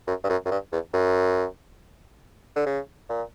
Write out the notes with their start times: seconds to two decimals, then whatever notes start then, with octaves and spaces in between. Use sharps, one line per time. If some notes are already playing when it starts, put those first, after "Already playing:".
0.07 F#2
0.24 G2
0.30 F#2
0.45 F#2
0.51 G2
0.72 E2
0.93 F#2
2.56 D3
2.66 C#3
3.09 A#2